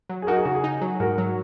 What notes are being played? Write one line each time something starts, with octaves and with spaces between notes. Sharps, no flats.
F#3
G#4
D#4 F#4 A#4
G#4
C#3 F#4
G#4
D#4
F#3
G#2 F#4 A#4
F#3